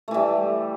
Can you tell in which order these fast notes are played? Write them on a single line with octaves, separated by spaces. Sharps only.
A3 E3 G3